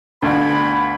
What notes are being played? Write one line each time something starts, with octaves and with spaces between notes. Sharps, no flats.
G1 D2 G5 G#5 B5